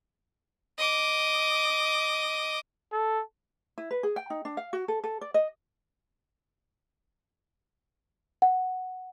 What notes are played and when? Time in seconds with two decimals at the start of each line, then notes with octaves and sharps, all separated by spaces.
0.78 D#5 D6
2.92 A4
3.78 E4
3.91 B4
4.03 G#4
4.16 G5
4.30 D#4
4.45 D4
4.57 F5
4.73 F#4
4.88 A4
5.04 A4
5.21 D5
5.34 D#5
8.42 F#5